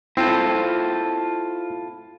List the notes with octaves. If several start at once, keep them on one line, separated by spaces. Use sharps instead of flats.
C4 E4 F4 A4